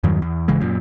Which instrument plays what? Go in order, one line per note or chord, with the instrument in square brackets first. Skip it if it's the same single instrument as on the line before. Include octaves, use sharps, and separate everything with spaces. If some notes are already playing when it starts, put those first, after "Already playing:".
[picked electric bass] E2 G2 D#3 F#3
E2
G#1 C#3 E3 G#3
F#2 A#2